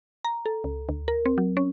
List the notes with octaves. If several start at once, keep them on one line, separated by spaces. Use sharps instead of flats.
A#5
A4
C#2
D2
A#4
C4
F#3
C#4